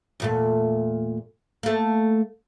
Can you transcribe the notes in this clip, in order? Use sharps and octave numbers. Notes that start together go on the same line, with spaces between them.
E2 A#2 A3
A3 A#3